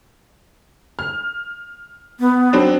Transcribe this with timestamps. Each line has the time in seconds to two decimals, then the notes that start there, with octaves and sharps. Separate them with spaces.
0.99 F6
2.20 B3
2.53 F#3 C4 D4